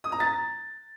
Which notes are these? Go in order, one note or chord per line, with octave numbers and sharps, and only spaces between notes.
D#6
A#5
A6